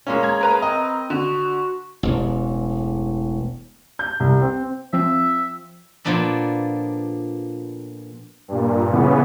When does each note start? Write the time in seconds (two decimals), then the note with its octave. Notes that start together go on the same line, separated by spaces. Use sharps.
0.07 A#2 G#3 A#3 C#4
0.23 G#4 A#5 G#6
0.41 A#4 B4 A#5
0.62 C4 D#5
1.10 D3 F#4
2.03 E1 A1
3.99 G6
4.20 C2
4.41 C4
4.93 F3 C4 E5
6.05 A#2 F3 B3 D4 A4
8.48 G2 A#2
8.91 C#3 E3 B3